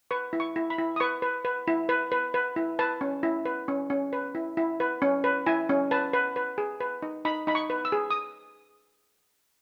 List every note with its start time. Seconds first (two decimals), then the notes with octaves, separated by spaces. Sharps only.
0.11 B4 C#6
0.33 E4
0.40 C#6
0.56 E4
0.70 B5
0.78 E4
0.96 D#6
1.00 B4 C#6
1.22 B4
1.45 B4
1.68 E4
1.89 B4
2.12 B4
2.34 B4
2.56 E4
2.79 B4 A5
3.01 C#4
3.23 E4
3.45 B4
3.68 C#4
3.90 C#4
4.13 B4
4.35 E4
4.57 E4
4.80 B4
5.02 C#4
5.24 B4
5.46 E4 G#5
5.69 C#4
5.91 B4 A5
6.13 B4
6.36 B4
6.58 G#4
6.81 B4
7.02 D#4
7.25 D#4 B5
7.47 D#4 B5
7.55 C#6
7.70 B4
7.85 E6
7.92 G#4
8.11 D#6